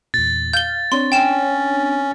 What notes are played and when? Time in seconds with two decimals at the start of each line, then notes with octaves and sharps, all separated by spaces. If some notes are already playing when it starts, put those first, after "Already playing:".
0.14 E2 A#2 A6
0.53 F5 G6 G7
0.92 C4 D4 C#5 C6
1.12 C#4 G5 E7